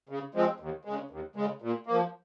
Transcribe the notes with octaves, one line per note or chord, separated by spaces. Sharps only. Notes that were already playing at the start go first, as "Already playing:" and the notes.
C#3
F3 G#3 C4
D#2
C#3 G#3
D#2
C#3 G#3
A#2
F3 A#3